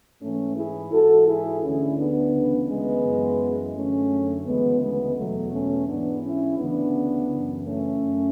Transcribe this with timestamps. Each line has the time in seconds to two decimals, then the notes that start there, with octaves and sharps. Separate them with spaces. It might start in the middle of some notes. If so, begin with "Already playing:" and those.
0.22 G#2 E3 A3 C#4
0.57 E4 G#4
0.92 G#2 E3 F#4 A4
1.27 E4 G#4
1.63 D2 D3 C#4 E4
1.98 B3 D4
2.33 D2 C#3 E3
2.69 G#3 B3
3.05 F#2 E3
3.75 F#2 D3 A3 C#4
4.46 D2 C#3 E3 G#3 B3
4.81 G#3 B3
5.16 E2 B2 F#3 A3
5.52 A3 C#4
5.87 G#2 E3 B3 D4
6.23 C#4 E4
6.58 D2 C#3 E3 B3 D4
7.29 F#2 C#3 E3
7.64 A3 C#4
8.00 F#2